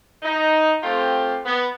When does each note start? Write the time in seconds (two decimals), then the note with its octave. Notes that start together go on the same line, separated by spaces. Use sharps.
0.23 D#4
0.82 A3 C4 F4 G4
1.46 B3